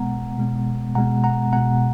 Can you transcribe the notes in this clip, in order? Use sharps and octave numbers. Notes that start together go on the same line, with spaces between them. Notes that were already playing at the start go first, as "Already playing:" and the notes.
Already playing: B2 G#3 B3 F#5 A#5
B2 G#3 B3
B2 G#3 B3 F#5 A#5
F#5 A#5
B2 G#3 B3 F#5 A#5